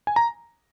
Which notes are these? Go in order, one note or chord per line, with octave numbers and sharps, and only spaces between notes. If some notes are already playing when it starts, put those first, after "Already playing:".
G#5
A#5